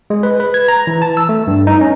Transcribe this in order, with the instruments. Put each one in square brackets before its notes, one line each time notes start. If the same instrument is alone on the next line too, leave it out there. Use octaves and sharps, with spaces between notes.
[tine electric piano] G#3
B4
B4
G#6
A#5
E3
A5
E6
A3
G2
D#4
C#4